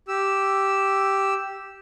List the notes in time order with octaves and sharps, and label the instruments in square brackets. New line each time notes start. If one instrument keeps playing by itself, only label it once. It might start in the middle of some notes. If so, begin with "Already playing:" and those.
[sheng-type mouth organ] G4 E6